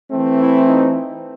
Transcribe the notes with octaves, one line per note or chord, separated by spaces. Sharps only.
E3 A3 C4
E4
D#4